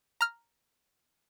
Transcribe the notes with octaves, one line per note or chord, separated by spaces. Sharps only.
A#5 F6